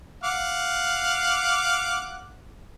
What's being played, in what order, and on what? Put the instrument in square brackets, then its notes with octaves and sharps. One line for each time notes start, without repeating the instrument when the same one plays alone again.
[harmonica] F5 F#5 D6